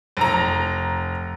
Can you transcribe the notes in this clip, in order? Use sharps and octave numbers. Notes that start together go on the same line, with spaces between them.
F1 A#5